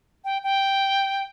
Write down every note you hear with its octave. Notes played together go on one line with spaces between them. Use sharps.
G5
G5